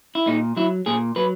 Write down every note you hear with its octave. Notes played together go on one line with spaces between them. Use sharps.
E4
A#2 D#4
F#3 E4
A#2 G#4
F#3 B4